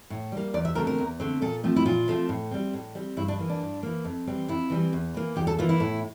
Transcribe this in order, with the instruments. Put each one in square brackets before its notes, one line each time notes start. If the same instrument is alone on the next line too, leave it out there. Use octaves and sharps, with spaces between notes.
[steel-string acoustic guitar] A2
G3 A#3
E2 D5
E5
D3 A3 C4 A#4
A#4
E2
D3 A3 C4
A#2 A4
F3 A3 C4
E4
A#2 F4
F3 A3 C4
A2
G3 C4
A2
G3 C4
G2 E4
D4
E3 A#3
D4
G2
E3 A#3
F2
E3 G3 C4
F2 E4
E3 G3 C4
E2
E3 A#3
E2 G4
A4
E3 A#3 F4
E4
A2